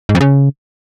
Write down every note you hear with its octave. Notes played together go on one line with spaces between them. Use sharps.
G#2
F2
C#3